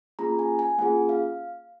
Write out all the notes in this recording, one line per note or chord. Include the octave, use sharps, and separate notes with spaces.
A#3 C#4 F4 G#4 A#5
G#5
G#5
A#3 C#4 F4 G#4 F#5
F5